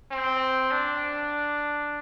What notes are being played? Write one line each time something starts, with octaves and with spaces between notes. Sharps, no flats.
C4
D4